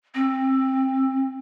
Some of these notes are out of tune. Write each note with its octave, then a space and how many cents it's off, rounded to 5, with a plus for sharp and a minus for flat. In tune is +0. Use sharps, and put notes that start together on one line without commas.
C4 +20